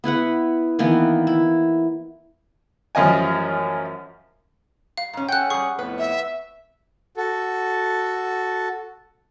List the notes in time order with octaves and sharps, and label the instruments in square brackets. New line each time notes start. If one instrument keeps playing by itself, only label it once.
[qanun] B3 E4 B4 F#5
D#3 E3 A#3 B3
E4
[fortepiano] A1 F#2 F3 D#5 G#5
[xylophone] F5
[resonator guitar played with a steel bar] G#2 C#4
[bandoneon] C#4 F#5 [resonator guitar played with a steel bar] A4 G5 [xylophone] F#6 G6
[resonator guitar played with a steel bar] G3 G#4 [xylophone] C#6
[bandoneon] F2 A2 B3 [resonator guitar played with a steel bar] B4
[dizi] E5
[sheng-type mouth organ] F#4 A4